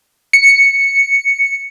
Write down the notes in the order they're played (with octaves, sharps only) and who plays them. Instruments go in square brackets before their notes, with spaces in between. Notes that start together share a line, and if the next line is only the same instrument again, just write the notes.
[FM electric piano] C#7